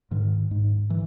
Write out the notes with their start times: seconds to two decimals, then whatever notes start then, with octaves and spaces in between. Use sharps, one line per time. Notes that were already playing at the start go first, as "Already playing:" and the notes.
0.11 G#2 D#3
0.51 G#2
0.90 E3